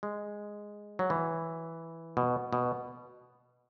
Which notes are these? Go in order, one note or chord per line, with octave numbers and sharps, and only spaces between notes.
G#3
F#3
E3
B2
B2